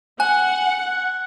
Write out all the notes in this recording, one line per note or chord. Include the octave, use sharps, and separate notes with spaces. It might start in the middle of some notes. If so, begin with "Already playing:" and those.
F#5 G#5 F#6